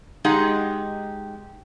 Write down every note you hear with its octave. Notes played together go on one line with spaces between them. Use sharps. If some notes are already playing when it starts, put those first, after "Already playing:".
G#3 D#4 G4 G#4 F#5